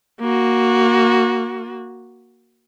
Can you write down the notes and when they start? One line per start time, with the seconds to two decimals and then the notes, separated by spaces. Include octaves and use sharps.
0.20 A#3 F#4